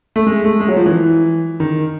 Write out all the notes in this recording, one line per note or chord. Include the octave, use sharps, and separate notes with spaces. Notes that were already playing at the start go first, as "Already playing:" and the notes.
A3
G#3
A3
G#3
F#3
F3
E3
D#3